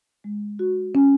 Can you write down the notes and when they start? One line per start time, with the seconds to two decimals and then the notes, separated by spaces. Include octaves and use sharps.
0.24 G#3
0.59 F#4
0.95 C#4